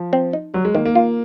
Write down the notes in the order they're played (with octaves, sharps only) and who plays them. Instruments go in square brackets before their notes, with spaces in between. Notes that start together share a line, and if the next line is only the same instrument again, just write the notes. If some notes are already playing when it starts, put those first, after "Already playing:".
Already playing: [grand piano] F3
[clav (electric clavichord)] C4
D#4
[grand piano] F#3 [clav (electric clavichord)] G3
[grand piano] G#3
[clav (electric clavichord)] D#3 [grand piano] A#3
[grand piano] A#3
[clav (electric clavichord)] F4